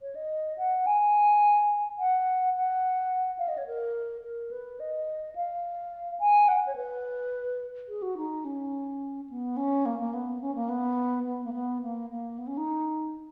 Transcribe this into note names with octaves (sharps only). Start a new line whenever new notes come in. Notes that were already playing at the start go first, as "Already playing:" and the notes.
C#5
D#5
F#5
G#5
F#5
F#5
F5
D#5
C#5
A#4
A#4
B4
D#5
F5
G#5
F#5
C#5
B4
G#4
F#4
D#4
C#4
B3
C#4
A#3
A#3
B3
C#4
A#3
B3
B3
A#3
B3
A#3
A#3
B3
C#4
D#4